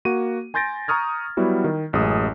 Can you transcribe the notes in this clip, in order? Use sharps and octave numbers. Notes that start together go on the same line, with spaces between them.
A#3 F#4 D#7
G#5 C6 G6 A6 A#6 D7
A#5 C#6 D#6 F6 G#6
F#3 G3 B3 E4 F#4
D#3
A1 F#2 G#3 D#6